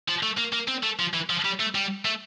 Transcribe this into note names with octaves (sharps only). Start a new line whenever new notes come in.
F3
A3
A#3
A#3
C4
A3
F3
E3
F3
G3
A3
G3
A3